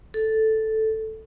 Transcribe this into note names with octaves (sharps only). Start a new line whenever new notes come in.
A4